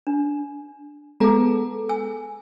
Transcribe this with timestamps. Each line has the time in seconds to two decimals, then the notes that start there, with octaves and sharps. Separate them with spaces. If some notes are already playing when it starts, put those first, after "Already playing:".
0.07 D4
1.20 G#3 B3 G#4 A4 A#5
1.89 G#5 E6